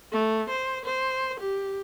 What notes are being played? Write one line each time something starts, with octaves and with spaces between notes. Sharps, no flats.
A3
C5
C5
G4